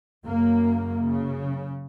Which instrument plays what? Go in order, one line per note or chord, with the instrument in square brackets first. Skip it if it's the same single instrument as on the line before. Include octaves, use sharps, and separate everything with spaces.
[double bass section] F#2 C#3 A#3
C#3